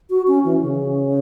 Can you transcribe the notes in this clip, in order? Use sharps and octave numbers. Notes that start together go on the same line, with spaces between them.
F#4
C#4
E3
C#3